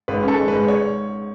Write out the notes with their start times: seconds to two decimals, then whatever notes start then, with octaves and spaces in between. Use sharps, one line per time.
0.08 G#1 B4
0.23 C#4
0.28 A4
0.38 G#3
0.48 G#2 B4
0.68 C#5